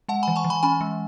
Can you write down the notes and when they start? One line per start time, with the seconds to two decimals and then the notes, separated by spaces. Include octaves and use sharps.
0.08 G#3 F#5 A5
0.23 E3 G#5 B5
0.36 A5 C#6
0.44 E3
0.50 G#5 B5
0.63 C#4 G#5 B5
0.81 G#3